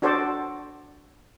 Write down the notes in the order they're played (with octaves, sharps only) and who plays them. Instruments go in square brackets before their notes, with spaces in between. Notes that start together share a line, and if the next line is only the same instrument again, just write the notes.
[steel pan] D4 F#4 A4 C5 D5